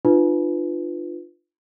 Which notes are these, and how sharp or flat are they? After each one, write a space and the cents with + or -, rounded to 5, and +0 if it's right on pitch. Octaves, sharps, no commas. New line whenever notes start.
D4 +45 F4 +0 B4 +10